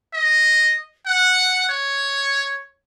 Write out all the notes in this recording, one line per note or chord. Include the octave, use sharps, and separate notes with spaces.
D#5
F#5
C#5